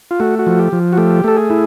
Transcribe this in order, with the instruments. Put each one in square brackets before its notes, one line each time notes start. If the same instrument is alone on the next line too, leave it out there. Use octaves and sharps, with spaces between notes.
[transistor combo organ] F4
A3 F#4
F#4
F3
G4
F3
F#4
A3 G4
A3 A4
G#4
E4